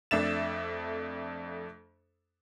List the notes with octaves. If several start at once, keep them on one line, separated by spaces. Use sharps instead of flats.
F2 A3 D4 E5 A6 E7